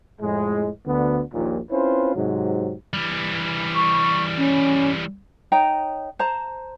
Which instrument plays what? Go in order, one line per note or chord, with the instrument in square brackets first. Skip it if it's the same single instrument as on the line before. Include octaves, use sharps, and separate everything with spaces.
[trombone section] F2 A2 G#3
D2 D3 B3
A#1 D#2 A#2
C4 C#4 E4 F4 B4 C5
G#2 C3 F#3
[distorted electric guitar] E3 G3
[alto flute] C#6
C#4
[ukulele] D#4 C#5 G5 A#5
C5 A5 A#5